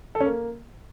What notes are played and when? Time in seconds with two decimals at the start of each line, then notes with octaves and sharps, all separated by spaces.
0.15 A4
0.20 C#4
0.26 A#3